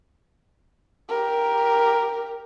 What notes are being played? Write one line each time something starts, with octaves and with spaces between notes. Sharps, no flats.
G4 A#4